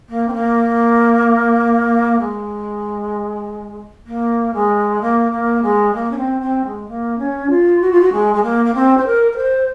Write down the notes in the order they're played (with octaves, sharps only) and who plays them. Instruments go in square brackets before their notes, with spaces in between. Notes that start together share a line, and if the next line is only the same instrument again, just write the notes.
[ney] A#3
C4
A#3
G#3
A#3
G#3
A#3
A#3
G#3
A#3
C#4
C4
C4
G#3
A#3
C#4
F4
F#4
F4
F#4
G#3
G#3
A#3
A#3
C4
C5
A#4
A#4
C5